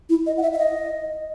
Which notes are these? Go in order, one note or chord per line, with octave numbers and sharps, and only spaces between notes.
E4
D#5
F#5
E5
E5
D#5